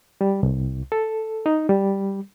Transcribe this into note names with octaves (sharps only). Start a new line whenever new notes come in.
G3
C2
A4
D#4
G3